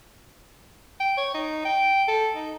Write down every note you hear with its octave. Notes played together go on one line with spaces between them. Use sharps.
G5
C#5
D#4
G5
A4
D#4